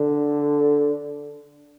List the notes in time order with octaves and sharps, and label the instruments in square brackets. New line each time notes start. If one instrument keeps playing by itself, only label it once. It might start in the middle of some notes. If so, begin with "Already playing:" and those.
Already playing: [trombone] D3